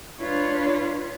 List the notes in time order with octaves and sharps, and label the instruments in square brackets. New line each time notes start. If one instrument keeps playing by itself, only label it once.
[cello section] D4 F4 B4 C#5